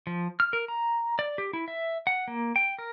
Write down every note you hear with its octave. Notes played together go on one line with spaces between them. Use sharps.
F3
F6
A#4
A#5
D5
G4
E4
E5
F#5
A#3
G5
A#4